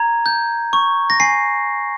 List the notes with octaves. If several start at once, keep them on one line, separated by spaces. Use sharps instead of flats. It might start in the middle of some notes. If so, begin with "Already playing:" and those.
Already playing: A#5 G#6
G6
C#6
A#6
G#5 C7